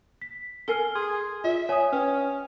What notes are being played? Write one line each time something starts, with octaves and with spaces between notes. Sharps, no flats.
B6
A4 A#4 G#5 F6 C7 G7
G#4 C6
F4 D5 E5
C#5 G#5 D#6
C#4 B4 G5 F6